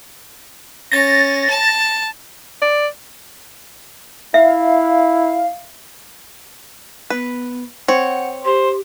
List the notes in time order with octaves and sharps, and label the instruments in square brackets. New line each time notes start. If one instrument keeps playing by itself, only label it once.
[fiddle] C#4 [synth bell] A6 A#6
[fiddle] A5
[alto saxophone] D5
[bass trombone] E4 [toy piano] E5 [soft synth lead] F5
[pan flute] B3 [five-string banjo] B4
[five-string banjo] C4 C#5 [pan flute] F#5
[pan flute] G4 [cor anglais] C5